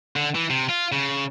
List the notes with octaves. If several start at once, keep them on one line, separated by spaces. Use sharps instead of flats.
D3
E3
C3
F4
C#3